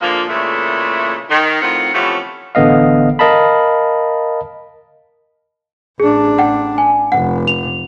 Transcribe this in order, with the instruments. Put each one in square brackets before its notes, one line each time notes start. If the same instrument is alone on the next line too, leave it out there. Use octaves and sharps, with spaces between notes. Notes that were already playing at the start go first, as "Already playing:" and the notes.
[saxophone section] A#2 D3 F3 G#3 A#3
A#2 C#3 E3 G#3 A3
D#3
A2 D#3 C4 F4 F5 F#5
C3 E3 F3 A3 B3 C#4
[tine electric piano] A1 D3 B3 D#5 F5
A#4 D#5 F5 A5 B5
[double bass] A1 D4 [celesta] G#4
[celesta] F#5 G5
G#5
[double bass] F1 [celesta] F#5
[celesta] F7